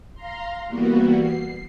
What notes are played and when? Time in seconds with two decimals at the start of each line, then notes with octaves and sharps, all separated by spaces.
0.14 F5 A#5 C6
0.68 E3 G3 A#3 B3 F#4
1.18 C7